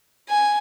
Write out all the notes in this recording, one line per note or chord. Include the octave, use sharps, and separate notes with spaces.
G#5